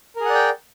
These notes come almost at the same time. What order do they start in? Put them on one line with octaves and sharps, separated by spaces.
A#4 G#4 F#5 D5 G5